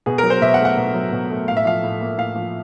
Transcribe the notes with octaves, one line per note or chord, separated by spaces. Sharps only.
B2 G#4
A#4
F#3
C5
B2 E5
F#5
A3
F#5
B2
F#3
B2
A3
A2 F5
E5
F3 F5
A2
A#3
A2 F5
F3